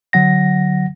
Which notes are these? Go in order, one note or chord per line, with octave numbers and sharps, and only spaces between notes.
D3 F#3 F#5 A#6